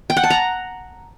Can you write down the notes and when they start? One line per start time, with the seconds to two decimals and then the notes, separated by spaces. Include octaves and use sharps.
0.10 G5
0.17 F#5
0.23 A5
0.30 A#5